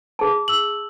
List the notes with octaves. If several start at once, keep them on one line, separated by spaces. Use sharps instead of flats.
G#4 A5
E6 F#7